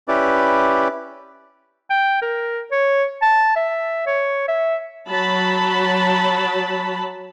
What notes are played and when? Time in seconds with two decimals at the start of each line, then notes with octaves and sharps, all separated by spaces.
0.08 C#4 E4 G4 B4 D5
1.90 G5
2.22 A#4
2.72 C#5
3.22 A5
3.56 E5
4.07 C#5
4.48 E5
5.06 F#3 A5 B5